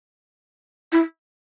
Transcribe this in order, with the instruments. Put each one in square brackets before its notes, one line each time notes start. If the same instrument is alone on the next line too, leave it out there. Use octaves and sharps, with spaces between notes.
[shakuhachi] E4